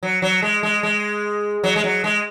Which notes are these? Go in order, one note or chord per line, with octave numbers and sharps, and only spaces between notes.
F#3
F#3
G#3
G#3
G#3
F#3
G#3
F#3
G#3